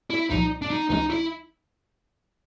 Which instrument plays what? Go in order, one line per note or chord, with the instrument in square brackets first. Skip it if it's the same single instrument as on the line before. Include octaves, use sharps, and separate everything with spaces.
[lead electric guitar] E4
[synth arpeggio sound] C2 A#2 F3 [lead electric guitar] D#4
[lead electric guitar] D4
D#4
[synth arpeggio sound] C#2 C3 E3 G#3 C#4 [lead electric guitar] D#4
[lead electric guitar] E4